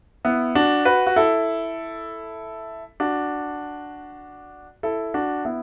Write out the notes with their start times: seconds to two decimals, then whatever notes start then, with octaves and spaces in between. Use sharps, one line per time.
0.25 B3 E4
0.55 D4 F#4
0.85 F#4 B4
1.07 F#4
1.16 E4 A4
3.00 D4 F#4
4.83 E4 A4
5.14 D4 F#4
5.45 B3 E4